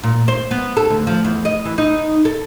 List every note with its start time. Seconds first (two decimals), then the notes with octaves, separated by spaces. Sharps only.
0.04 A#2
0.28 C5
0.51 B3
0.77 A4
0.90 D2
1.07 F3
1.25 E2
1.45 D#5
1.65 E3
1.78 D#4
2.25 A4